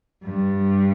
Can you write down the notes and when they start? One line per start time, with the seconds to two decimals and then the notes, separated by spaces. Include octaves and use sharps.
0.24 G2